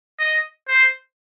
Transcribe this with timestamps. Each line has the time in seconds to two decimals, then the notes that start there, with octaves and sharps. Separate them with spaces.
0.19 D#5
0.68 C5